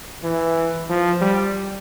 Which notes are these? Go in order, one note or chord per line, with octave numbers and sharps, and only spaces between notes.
E3
F3
G3